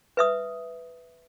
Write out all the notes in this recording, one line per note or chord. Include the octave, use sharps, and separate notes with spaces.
B4 E5 D#6